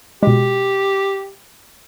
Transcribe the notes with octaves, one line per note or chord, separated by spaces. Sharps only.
B2 G#3 G4